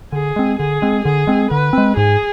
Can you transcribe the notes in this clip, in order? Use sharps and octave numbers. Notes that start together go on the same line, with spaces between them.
D3 G#4
G#3 C4
D3 G#4
G#3 C4
D3 G#4
G#3 C4
D3 B4
G#3 C4
G#2 G#4